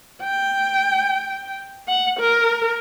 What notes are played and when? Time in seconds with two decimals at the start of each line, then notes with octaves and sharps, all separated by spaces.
0.23 G5
1.88 F#5
2.19 A#4